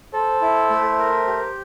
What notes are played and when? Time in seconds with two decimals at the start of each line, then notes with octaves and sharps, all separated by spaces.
0.13 A4 C5
0.42 E4
0.70 A3
0.99 A#4
1.27 G4